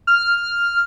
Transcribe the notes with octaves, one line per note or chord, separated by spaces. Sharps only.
F6